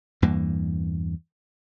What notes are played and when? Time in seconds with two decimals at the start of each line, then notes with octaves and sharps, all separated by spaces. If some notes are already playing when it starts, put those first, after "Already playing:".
0.22 E2 G2 E3 A#3